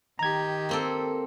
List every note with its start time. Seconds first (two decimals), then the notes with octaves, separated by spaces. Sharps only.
0.19 D#3 G4 A#5 G#6
0.69 A#3 C4 A4